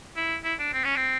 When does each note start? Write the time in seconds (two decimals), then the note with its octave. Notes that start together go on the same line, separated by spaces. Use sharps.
0.16 E4
0.44 E4
0.59 D4
0.73 C4
0.84 C#4
0.97 C4